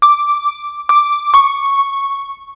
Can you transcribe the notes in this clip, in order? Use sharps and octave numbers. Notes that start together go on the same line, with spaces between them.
D6
D6
C#6